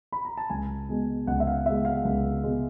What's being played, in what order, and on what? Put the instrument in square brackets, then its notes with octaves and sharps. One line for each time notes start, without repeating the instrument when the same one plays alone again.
[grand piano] B5
A#5
A5
C#2 G#5
B2 G#3
C#2 F#5
E5
F5
B2 G#3 E5
F5
C#2
B2 G#3